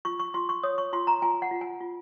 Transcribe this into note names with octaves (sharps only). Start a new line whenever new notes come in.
F4 C#6
C#6
F4 C6
C#6
C#5 D#6
C#6
F4 C6
A#5
F4 G#5
F#5
F4
G#5
F4